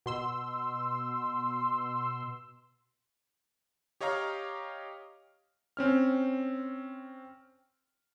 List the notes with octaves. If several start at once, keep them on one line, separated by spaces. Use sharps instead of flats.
B2 C6 E6
G4 C#5 D#5 F5 A#5 F6
C4 C#4 F6